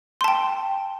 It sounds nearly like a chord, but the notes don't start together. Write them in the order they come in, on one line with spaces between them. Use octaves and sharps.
C6 A5 G5